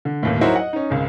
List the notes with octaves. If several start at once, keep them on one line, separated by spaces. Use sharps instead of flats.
D3
G1 D#2 A2
F#3 D#4 E4 F#4 A#4 C5
D#5 F#5
C#4 D#4
G#1 C#2